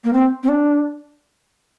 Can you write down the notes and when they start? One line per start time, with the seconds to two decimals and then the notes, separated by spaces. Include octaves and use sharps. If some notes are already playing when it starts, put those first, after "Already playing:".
0.04 A#3
0.13 C4
0.43 C4
0.48 D4